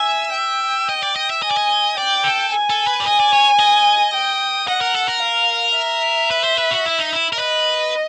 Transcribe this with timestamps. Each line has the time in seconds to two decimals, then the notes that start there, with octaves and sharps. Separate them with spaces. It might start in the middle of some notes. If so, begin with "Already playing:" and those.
Already playing: E5 G#5
0.35 G5
0.89 D#5
1.03 D5
1.16 D#5
1.30 E5
1.43 D#5 G#5
1.51 D5
1.57 D#5
1.97 D5 G5
2.24 A4
2.52 G#5
2.70 A4
2.87 B4
3.00 D5
3.06 D#5 G#5
3.20 D5
3.33 C#5
3.59 D#5
4.14 G5
4.68 D#5 F#5
4.81 A#4
4.95 A4
5.08 A#4
5.22 F5
5.77 E5
6.31 B4
6.44 C5
6.58 B4
6.71 F#4
6.86 E4
6.99 D#4
7.13 E4
7.33 A#4
7.39 B4 D#5